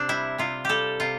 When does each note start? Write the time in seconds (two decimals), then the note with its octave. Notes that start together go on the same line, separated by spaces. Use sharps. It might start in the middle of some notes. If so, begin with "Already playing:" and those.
Already playing: C3 C4 D4
0.09 G3 E4
0.38 C3 F4
0.65 G3 G4 A4
1.00 C3 F4